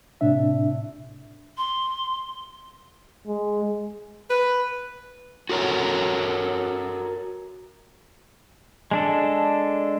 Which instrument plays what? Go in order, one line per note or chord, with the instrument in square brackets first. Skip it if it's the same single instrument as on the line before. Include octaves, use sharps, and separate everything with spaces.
[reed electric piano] A2 C3 D4 E5
[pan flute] C6
[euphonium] G#3
[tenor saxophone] B4
[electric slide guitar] F#4 A4 A#4 C#5
[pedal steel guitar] G#3 D4 A4